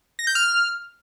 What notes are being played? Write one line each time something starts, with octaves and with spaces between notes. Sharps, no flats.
A#6
G6
F6